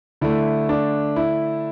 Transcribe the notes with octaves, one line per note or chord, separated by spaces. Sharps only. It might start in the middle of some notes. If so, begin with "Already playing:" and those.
D3 A3 E4
D4
E4